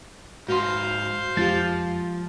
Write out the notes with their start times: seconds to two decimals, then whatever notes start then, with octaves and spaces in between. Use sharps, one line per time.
0.48 G#2 F#4 B4 C5 F5 C6 G6
1.37 F2 F3 G#3 F4 G4 A6